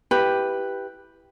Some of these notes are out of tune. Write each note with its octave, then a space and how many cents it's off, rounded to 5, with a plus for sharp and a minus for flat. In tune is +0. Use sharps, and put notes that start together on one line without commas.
E4 +10 G4 +0 B4 +0